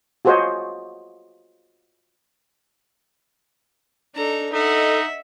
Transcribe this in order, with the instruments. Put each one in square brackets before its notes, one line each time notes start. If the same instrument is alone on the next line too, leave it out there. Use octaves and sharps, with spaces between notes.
[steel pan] F4 F#4 G#4 C5 C#5 D#5
[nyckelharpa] D4 A4 [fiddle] D#4 A#5
[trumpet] D#4 [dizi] A4 [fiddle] D#5 F#5 [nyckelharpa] E5